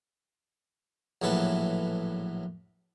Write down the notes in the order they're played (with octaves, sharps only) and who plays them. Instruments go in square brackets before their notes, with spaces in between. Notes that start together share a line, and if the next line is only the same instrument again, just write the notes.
[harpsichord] A#1 A2 E3 F#3 A4 B4